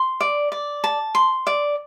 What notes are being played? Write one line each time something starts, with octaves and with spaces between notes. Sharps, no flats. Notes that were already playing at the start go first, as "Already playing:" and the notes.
Already playing: C6
D5
D5
A5
C6
D5